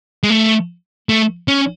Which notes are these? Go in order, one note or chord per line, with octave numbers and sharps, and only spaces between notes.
G#3
A3
A3
C#4